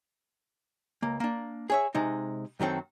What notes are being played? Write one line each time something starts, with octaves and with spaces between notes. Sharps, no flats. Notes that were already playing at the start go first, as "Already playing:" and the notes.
C#2 A#3
A#3 D4
G#4 C#5 E5
C3 G#3 D#4
F#2 D#3 F#3 C4 A4